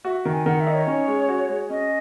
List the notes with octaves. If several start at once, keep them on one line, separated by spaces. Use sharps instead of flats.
F#4 E5
D#3
G#5
D#3 F#5
E5
D#4
C#5
C#4
G#3
F#4
G#3
C#4 D#5